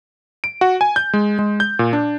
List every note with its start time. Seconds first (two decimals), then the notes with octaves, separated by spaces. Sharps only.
0.44 D7
0.61 F#4
0.81 G#5
0.96 G6
1.13 G#3
1.39 G#3
1.60 G6
1.79 A#2
1.93 D4